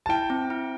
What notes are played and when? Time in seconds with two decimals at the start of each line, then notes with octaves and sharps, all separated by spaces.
0.06 A5
0.09 E4 G5
0.30 C4
0.50 E4